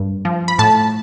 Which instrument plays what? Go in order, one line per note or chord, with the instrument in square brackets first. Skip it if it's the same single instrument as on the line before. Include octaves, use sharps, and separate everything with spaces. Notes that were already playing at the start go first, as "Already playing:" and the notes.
Already playing: [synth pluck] G2
F3
B5
A2 A5